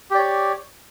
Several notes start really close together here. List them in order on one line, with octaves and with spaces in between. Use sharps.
G4 D5 C#5